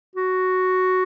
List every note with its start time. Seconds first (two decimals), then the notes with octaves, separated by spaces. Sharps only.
0.16 F#4